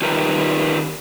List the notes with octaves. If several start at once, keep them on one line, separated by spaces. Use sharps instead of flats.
D#3 D#4 F4 G4 A#4 B4